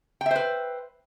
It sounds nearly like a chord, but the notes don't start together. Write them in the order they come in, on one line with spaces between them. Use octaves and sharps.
G5 E5 C5 B4